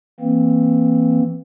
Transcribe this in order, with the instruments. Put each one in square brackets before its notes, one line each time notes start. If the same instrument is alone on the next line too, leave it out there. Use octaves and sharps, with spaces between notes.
[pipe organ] E3 A#3 C4